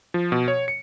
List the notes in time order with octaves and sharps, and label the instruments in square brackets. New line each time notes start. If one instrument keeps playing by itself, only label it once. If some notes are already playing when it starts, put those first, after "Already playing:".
[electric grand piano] F3
B2
C#5
C#7